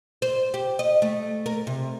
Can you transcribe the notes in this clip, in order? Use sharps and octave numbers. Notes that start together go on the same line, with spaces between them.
C5
G4
D#5
A3
A#4
C3